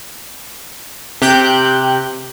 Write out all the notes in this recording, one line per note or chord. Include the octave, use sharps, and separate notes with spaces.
C3 G4 F#6 G6